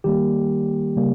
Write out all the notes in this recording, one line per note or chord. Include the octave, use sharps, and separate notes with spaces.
D#3 G3 A#3 G4
C#3 G3 A#3